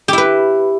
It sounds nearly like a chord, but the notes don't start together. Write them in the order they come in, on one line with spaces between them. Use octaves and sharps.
G4 E4 B4